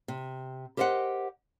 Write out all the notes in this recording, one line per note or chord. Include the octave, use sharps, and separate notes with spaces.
C3
G4 A#4 C5 D#5 E5 F#5